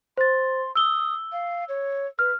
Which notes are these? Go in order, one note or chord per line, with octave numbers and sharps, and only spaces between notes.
C5 C6 A6
D#6 E6 G7
F5
C#5
B4 F6